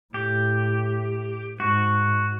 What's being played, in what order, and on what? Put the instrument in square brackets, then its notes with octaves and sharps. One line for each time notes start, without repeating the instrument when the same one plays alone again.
[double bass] A2 [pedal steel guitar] G4
[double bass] G#2 [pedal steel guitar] F#4